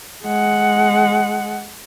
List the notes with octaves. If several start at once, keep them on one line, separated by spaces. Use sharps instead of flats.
G#3 F#5